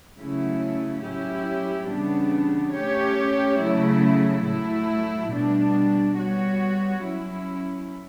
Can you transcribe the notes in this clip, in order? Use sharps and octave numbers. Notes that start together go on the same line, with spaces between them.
C#3 F#3 A3 C#4 E4
A2 F#3 C#4 E4 G4
C#3 E3 G3 B3 D4
A3 C#4 G4 C#5
C#3 F#3 A3 E4
A2 F#3 A3 E4
B2 G3 D4
G3 B3 F#4 C#5
F#3 C#4 E4